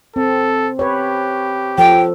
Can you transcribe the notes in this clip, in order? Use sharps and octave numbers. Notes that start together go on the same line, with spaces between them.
C4 A4
G4 B4 C#5
F3 A4 G5